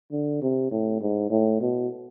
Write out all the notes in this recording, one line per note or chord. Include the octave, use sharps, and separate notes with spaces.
D3
C3
A2
G#2
A2
B2